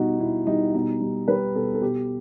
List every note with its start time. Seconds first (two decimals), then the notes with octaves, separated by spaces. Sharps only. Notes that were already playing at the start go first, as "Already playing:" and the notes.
Already playing: B2 G3 D#4 F#4
0.20 B2 E4
0.47 G3 D#4
0.74 B2 D#4
1.01 G3
1.28 G3 B4
1.55 B2 A4
1.74 A4
1.82 B2 G4